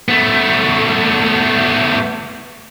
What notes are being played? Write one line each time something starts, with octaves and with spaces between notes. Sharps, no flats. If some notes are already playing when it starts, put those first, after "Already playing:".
A3 B3